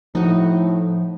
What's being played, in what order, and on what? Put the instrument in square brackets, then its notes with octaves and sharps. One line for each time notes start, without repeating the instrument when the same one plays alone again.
[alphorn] A2 [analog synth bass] F3 [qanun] D#4 F#4